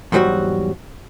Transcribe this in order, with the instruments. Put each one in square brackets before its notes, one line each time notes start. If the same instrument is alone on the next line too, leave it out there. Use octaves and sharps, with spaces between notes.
[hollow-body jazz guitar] E2 G#2 F#3 G3 F#4